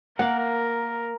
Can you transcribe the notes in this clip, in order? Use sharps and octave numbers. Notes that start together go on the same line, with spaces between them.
A#3 A#4 F5 F#5